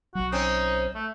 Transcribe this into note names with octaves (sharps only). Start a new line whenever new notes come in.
B1 F#3 F#4
C4 C#4 D#4
A3